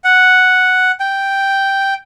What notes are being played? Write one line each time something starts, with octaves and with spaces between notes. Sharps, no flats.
F#5
G5